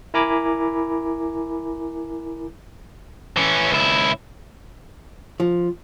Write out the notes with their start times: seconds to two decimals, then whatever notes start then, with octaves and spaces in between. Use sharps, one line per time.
0.14 E4 A#4 G#5 A#5 B5 D6
3.37 E3 C#4
3.71 C#2 E4
5.40 F3